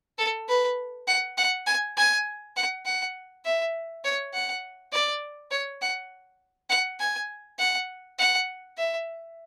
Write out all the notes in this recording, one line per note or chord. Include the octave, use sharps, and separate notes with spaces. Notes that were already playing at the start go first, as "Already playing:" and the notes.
A4
B4
F#5
F#5
G#5
G#5
F#5
F#5
E5
C#5
F#5
D5
C#5
F#5
F#5
G#5
F#5
F#5
E5